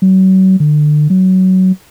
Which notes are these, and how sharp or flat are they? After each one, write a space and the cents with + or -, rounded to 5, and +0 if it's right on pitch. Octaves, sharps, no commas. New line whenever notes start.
F#3 +35
D3 +30
F#3 +15